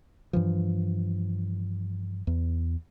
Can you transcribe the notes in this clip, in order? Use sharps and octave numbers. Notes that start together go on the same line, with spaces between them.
G2 E3 F3
E2